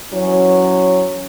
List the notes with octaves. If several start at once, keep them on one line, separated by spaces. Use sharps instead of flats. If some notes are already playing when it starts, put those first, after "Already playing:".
E3 F#3 C#4